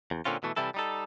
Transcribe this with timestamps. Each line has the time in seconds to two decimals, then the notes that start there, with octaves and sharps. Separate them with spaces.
0.11 E2
0.25 A#2 D3 C4 C#4 F4
0.43 B2 E3 A3
0.56 C3 E3 G3 E4 A4
0.74 G3 D#4 A4